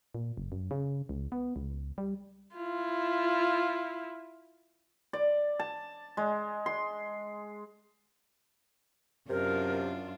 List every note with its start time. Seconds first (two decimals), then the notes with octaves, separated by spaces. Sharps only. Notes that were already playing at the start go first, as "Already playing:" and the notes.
0.15 A#2
0.37 F#1
0.52 F#2
0.71 C#3
1.09 C#2
1.32 B3
1.56 C#2
1.98 G3
2.56 E4 F4
5.13 D5
5.60 A5
6.17 G#3
6.66 C6
9.30 F#2 C3 D4 F4 A#4